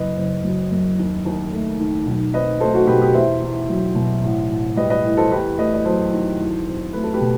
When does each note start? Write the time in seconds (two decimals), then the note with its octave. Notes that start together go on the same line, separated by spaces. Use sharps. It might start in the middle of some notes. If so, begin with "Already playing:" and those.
Already playing: F#1 B4 D#5
0.16 F#1
0.44 F#3
0.71 F#2
0.99 D#2
1.25 D#2
1.52 A3
1.80 D#3
2.06 B1
2.34 C4 B4 D#5
2.60 A3 A4 C5
2.73 F#4 A4
2.87 B2 G4 B4
3.02 G4
3.14 E2 C5 E5
3.42 E2
3.69 F#3
3.95 B2
4.23 A1
4.50 A1
4.76 G3 B4 D#5
4.90 B4 D#5
5.05 A2
5.17 A4 C5
5.31 E2 G4 B4
5.58 A3 B4 D#5
5.74 D#5
5.85 F#3 A4 C5
6.13 D#3
6.39 E2
6.66 C4
6.93 A3 B4
7.03 A4
7.13 G4 B4
7.21 B2